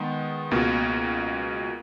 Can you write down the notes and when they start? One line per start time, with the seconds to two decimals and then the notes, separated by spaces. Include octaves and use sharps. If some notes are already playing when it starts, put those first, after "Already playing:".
Already playing: D#3 G#3 B3
0.51 C#2 B2 A#3